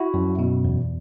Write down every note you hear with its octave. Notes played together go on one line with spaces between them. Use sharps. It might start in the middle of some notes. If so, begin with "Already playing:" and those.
Already playing: E4 F#4
F#2
B2
E2